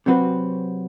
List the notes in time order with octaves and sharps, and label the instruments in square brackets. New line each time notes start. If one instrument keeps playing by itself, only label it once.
[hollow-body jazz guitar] C3 F#3 C4 F#4 B4